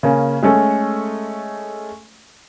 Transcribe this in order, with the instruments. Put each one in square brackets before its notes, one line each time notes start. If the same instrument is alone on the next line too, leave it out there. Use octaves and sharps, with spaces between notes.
[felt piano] C#3 A#3 C#4
G#3 A3 C#4 A4